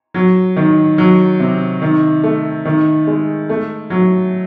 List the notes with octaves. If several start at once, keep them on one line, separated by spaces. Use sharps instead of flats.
F#3
D#3
F#3
C3
D#3
A3
D#3
G#3
A3
F#3